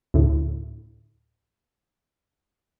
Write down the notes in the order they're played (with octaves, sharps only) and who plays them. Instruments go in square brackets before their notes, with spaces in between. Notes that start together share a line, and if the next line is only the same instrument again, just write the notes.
[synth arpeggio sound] D2 A2